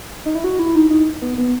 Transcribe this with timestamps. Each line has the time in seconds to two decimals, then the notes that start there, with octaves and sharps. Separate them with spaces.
0.26 D#4
0.35 E4
0.44 F#4
0.59 E4
0.75 D#4
0.90 D#4
1.22 B3
1.38 B3